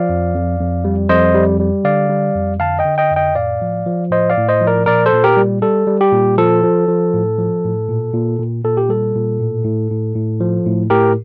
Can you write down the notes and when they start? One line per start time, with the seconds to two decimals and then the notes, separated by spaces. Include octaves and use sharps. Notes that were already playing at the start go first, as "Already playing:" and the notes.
Already playing: F3 D5 F5
0.09 F2
0.34 F2
0.59 F2
0.84 G3
1.09 F2 C5 D#5
1.34 G3
1.60 G3
1.84 D3 D5 F5
2.10 G3
2.35 F2
2.60 D3 F5 A5
2.79 D#5 G5
2.85 D3
2.98 D#5 G5
3.10 F2
3.16 D#5 G5
3.35 A2 D5 F5
3.62 F3
3.86 F3
4.11 A2 C5 D#5
4.30 D5 F5
4.37 A2
4.49 C5 D#5
4.61 F3
4.67 A#4 D5
4.86 A#2 A#4 D5
5.06 A4 C5
5.12 A#2
5.24 G4 A#4
5.37 G3
5.62 G3 A4
5.87 G3
6.01 G4
6.12 A#2
6.38 F3 A4
6.63 F3
6.88 F3
7.14 A2
7.38 F3
7.64 A2
7.89 A#2
8.14 A#2
8.39 A#2
8.64 A#2 A4
8.77 G4
8.89 G3 A4
9.15 A#2
9.40 A2
9.65 A2
9.91 A2
10.16 A2
10.40 F3
10.66 A2
10.90 A2 G4 A#4